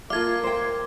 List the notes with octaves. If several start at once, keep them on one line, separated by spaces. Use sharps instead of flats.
A#3 F4 A4 F5 D6 G#6
C5 G5